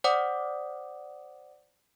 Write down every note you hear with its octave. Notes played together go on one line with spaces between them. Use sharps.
C5 D5 F#5 D6 D#6